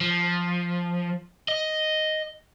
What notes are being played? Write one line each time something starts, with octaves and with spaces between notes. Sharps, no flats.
F3
D#5